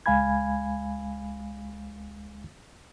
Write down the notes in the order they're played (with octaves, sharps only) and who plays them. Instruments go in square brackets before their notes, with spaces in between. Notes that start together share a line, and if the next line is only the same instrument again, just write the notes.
[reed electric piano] C#2 G#3 F5 G#5 B5 G#6